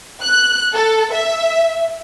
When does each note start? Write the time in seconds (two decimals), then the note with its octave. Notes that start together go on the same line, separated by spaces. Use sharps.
0.22 F#6
0.74 A4
1.14 E5